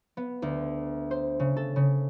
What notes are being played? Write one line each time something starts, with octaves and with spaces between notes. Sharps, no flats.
B3
D2
C5
C#3
A4
C#3